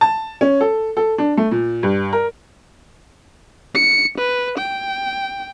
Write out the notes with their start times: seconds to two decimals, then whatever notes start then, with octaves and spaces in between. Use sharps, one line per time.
0.01 A5
0.41 C#4
0.61 A4
0.97 A4
1.18 D4
1.37 A3
1.51 A#2
1.83 G2
2.13 A#4
3.75 C#7
4.18 B4
4.58 G5